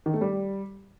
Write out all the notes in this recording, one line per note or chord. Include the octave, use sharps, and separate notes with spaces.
D#3
A3
G3